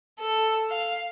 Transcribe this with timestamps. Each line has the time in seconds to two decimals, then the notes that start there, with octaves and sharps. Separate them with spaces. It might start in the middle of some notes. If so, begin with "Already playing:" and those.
0.20 A4
0.71 F5